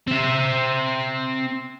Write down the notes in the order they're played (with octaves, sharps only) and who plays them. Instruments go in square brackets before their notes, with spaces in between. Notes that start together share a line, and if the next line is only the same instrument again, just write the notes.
[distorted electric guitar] C4 E5